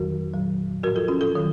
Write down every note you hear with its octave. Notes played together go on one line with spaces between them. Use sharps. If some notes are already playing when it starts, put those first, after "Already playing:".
Already playing: F2 D#3 F#3 F#4 A#4
A#2 F#3
A2 F3 F#4 A#4
F4 A4
C#4 F4
F4 A4
D#3 F#3